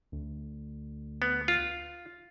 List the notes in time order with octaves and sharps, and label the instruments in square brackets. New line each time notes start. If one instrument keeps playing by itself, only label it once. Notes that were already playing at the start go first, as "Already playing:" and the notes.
[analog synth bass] D2
[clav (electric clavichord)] B3
F4